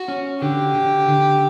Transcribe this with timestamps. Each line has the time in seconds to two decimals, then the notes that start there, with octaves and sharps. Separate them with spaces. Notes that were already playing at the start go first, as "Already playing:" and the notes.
Already playing: F#4
0.08 C#4
0.41 D3 G4
0.75 D3
1.08 D3